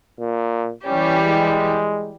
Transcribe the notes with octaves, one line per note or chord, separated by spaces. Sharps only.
A#2
E3 G3 C#4 G4
G#3